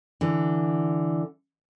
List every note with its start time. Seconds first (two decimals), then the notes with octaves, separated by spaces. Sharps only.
0.21 D3 E3